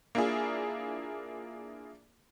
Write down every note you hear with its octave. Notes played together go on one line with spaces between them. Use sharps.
A#3 D4 E4 F4 G#4